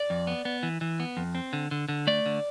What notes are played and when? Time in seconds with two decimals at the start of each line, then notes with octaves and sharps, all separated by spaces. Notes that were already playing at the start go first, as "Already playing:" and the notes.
Already playing: D5
0.10 F2
0.27 B3
0.45 B3
0.63 E3
0.81 E3
1.00 B3
1.17 F2
1.35 C4
1.53 D3
1.71 D3
1.89 D3
2.07 A3 D5
2.26 D3